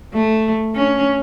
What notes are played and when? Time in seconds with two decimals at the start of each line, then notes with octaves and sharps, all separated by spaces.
0.14 A3
0.75 C#4